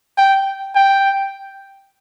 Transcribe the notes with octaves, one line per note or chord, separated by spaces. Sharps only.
G5
G5